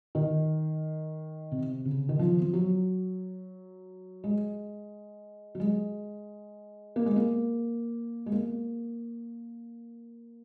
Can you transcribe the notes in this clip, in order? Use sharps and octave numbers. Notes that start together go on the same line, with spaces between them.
D#3
C3
C#3
D#3
F3
F3
F#3
G#3
F#3
G#3
A#3
G#3
A#3
G#3
A#3